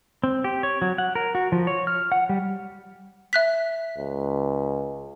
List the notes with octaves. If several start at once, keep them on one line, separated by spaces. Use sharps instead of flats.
C4
G4
C#5
F#3
F#5
A#4
F#4
F3
C#5
F6
F#5
G3
E5 F#6 B6
C#2